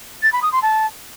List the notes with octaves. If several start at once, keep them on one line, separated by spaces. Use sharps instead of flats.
A6
B5
D#6
C6
A5